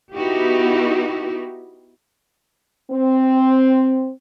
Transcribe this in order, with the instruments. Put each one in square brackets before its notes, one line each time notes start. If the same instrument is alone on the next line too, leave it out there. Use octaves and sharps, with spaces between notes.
[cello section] B3 D#4 E4 F#4 G4
[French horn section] C4